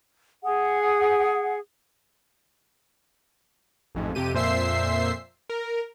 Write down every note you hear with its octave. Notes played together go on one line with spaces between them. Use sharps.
G#4 F#5
A1 F2 G#2
F2 C3 G4 D#7
F2 A#2 C5 E5 E6 C7
A#4